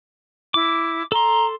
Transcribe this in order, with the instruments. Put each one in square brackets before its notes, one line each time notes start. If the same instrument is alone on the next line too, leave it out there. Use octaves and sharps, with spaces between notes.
[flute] E4 [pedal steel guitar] D6
[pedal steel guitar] A4 C6 [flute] A#5